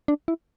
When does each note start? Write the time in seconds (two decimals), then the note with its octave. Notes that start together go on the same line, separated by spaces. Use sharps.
0.08 D4
0.28 E4